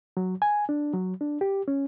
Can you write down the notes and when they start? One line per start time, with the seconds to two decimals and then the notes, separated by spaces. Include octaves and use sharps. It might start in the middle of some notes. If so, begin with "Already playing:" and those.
0.17 F#3
0.42 G#5
0.69 D4
0.94 F#3
1.21 D4
1.41 G4
1.68 C#4